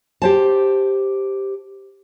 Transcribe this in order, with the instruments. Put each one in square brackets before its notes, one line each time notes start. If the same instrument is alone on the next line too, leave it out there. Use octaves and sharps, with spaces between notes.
[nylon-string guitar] G4 C5 A5